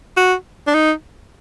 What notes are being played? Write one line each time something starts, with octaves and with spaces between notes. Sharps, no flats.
F#4
D4
D#4